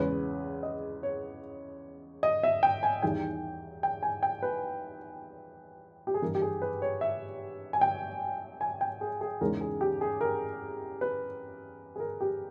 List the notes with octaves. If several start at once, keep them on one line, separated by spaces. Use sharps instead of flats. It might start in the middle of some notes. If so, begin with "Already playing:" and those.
Already playing: E2 C#3 G#3 C#4 B4
D#5
C#5
D#5
E5
G5
G#5
E2 D#3 G3 G5
G5
G#5
G5
B4
G4
G#4
G2 E3 G3 A#4
G4
G#4
B4
C#5
E5
G#5
G5
G#5
G5
G#4
G#4
E2 C#3 G#3 D#4 A#4
G#4
G4
G#4
A#4
B4
G#4
A#4
G4